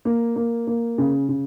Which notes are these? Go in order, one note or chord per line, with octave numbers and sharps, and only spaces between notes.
A#3
A#3
A#3
C#3
C#3